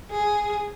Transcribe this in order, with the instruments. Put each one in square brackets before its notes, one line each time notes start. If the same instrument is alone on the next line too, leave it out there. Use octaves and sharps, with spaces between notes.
[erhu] G#4